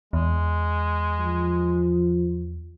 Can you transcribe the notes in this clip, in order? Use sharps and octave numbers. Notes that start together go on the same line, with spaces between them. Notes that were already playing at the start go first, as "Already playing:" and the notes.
E2 G#3
F3